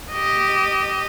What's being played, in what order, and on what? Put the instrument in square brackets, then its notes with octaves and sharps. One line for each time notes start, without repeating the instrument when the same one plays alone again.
[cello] G4 D#5